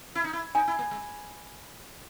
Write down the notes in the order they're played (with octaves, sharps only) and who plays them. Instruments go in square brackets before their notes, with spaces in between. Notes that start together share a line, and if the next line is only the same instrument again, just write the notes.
[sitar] E4
D#4
E4
[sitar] D#4 [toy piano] G#5
[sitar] E4
A#3
G#3